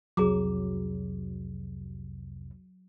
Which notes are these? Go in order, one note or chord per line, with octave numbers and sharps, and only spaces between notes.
C2 F2 C3 F#3 G#4 A#5 D6